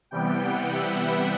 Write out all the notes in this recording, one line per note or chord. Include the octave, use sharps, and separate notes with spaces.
C3 E3 G3 B3 G5
F#5
E5
B4